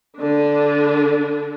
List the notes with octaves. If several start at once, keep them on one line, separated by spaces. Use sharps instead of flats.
D3 D4